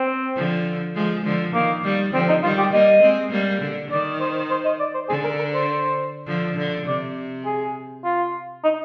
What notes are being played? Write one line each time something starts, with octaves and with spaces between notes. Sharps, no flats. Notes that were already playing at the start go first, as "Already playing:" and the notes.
Already playing: C4
D3 F3
F3 G#3
D3 F3
D#3 A#3
D#3 G3
D3 F3 C4
D#4
D#3 G3 F4
G4
G3 A#3 D#5
G#3 C4
G3 A#3
D3
D#3 D5
C5
C5
D#5
D5
C5
D3 G#4
A#4
A#4
C5
D3 F3
D3
C3 D5
G#4
F4
D#4